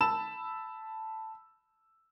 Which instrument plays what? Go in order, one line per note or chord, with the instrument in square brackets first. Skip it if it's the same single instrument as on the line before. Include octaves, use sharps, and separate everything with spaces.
[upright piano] A5 B5 E6 E7